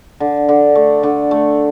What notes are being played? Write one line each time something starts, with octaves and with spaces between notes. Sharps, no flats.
D3
D3
A3
D3
A3